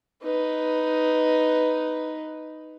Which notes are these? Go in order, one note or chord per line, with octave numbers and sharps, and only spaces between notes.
D#4 B4